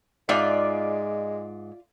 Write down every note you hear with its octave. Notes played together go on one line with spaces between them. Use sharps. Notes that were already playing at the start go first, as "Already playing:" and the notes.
G#2 G#3 F4 D5 E5